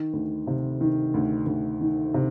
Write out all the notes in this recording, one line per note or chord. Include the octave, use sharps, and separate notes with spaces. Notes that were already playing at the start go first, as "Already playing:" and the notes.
Already playing: D#3
D2
C3
D#3
D2
D2
D#3
C3